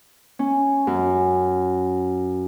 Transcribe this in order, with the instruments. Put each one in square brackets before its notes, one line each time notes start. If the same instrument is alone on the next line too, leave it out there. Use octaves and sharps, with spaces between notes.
[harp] C#4
F#2